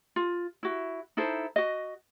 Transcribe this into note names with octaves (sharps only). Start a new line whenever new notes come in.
F4
E4 F#4
D#4 E4 A4 C5
F#4 D#5